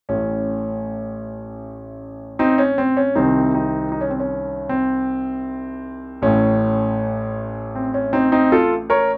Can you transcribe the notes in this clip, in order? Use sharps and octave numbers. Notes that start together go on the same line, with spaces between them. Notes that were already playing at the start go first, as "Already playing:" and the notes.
A1 A2 C#4
C4 D#4
C#4
C4
C#4
C2 C3 D#3 C4 D#4
C4 D#4
D#4
C#4
C4
C#4
C4
A1 A2 C#4
C4
C#4
C4 D#4
C4 D#4
F4 A4
A#4 C#5